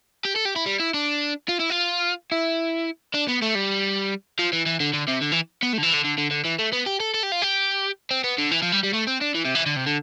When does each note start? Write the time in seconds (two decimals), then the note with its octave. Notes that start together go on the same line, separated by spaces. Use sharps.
0.25 G4
0.36 A4
0.45 G4
0.56 E4
0.66 G3
0.80 E4
0.94 D4
1.49 F4
1.60 E4
1.70 F4
2.32 E4
3.14 D4
3.29 B3
3.42 A3
3.55 G3
4.39 F3
4.53 E3
4.66 E3
4.80 D3
4.93 D3
5.08 C3
5.21 D3
5.32 E3
5.63 B3
5.73 A3
5.78 D3
5.83 E3
5.93 D3
6.04 D3
6.18 D3
6.31 D3
6.45 E3
6.59 A3
6.73 B3
6.86 G4
7.00 A4
7.14 A4
7.23 G4
7.32 F4
7.42 G4
8.11 C4
8.24 B3
8.38 D3
8.51 E3
8.62 F3
8.72 G3
8.83 G3
8.93 A3
9.07 C4
9.21 D4
9.34 E3
9.45 C3
9.55 E3
9.66 D3
9.76 C3
9.86 D3